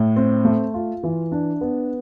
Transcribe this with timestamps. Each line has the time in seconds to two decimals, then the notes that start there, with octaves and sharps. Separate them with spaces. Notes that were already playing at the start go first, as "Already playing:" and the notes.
Already playing: A2
0.16 C4
0.45 A3
0.74 F4
1.03 E3
1.32 D4
1.61 B3